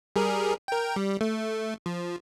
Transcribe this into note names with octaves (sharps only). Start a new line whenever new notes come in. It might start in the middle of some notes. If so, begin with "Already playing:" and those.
G3 G#4 A#4
A#4 G5
G3
A3
F3